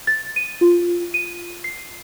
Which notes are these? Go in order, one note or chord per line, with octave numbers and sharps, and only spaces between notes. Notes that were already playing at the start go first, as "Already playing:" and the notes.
A6
D#7
F4
D#7
C7